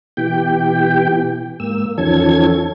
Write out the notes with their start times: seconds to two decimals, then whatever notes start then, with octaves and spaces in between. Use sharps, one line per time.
0.17 B2 E3 G4 G5
1.60 G#2 A#3 E6
1.98 E2 D#3 F3 C#4 A4 G#6